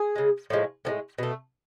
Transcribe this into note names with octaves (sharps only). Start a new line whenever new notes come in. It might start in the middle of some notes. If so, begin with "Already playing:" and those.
Already playing: G#4
C#3 G#3
A2 F3 G#3
A2 F3 G#3
B2 A3